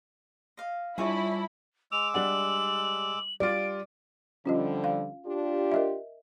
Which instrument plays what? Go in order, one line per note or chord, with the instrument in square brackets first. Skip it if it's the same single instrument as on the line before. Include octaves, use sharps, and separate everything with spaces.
[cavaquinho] D#5 F5
[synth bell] G3 F4 E5 [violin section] D4 E4 B5 [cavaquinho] G#4 C#5
[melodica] G#3 D6 E6 [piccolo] F7
[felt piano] G3 D4 F#5 [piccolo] F#7
[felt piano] G3 F4 [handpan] D5 [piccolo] D7
[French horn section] D3 F3 G3 [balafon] C#4 F4 D#5
[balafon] F5
[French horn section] D4 F4 G4
[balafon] A#4 D#5 E5